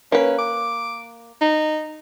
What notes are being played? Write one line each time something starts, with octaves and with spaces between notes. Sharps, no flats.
A#3 C#4 B4
D6
D#4